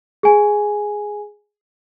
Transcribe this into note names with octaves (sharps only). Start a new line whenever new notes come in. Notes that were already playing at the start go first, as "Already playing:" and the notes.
G#4 G#5